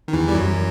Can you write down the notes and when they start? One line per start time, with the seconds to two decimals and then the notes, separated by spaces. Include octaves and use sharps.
0.08 D#3
0.13 E2 E3
0.28 G3
0.34 F#2 F#3